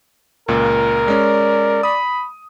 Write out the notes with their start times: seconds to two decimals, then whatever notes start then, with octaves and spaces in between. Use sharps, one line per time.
0.48 C#2 A#2 A#4
1.08 G#3 C#4 D5
1.83 B5 D#6